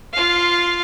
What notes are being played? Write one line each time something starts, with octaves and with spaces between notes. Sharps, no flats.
F4 F5